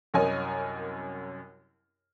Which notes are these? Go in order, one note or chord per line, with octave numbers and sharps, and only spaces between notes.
C2 F#2 A#4 C#5 D#5 G#5